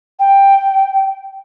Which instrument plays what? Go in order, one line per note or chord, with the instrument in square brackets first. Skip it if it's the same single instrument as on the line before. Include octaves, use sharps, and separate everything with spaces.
[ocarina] G5